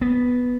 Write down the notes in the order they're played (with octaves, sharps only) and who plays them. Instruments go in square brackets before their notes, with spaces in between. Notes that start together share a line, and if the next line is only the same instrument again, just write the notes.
[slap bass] B3